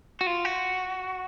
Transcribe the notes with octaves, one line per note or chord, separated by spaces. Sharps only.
F#4
F4
F#4